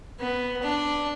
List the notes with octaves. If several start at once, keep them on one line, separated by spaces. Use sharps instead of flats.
B3
D4